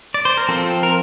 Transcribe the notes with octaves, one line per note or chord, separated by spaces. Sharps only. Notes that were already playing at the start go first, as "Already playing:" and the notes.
D5
C5
A#4
F3 C4 F4 A4
A#4